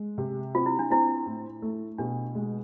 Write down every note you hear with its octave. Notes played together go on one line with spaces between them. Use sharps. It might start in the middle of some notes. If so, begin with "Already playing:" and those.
Already playing: G#3
C3
C4 F4
E4
D4
C4 E4
A2
A3
B2 D4
G#3